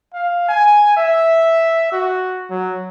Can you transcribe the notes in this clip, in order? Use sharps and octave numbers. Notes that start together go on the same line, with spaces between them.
F5
G#5
E5
F#4
F#3